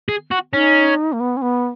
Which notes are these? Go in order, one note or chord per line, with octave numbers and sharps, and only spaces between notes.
G#4
F#4
C#4 D#4
A#3
B3
C#4
B3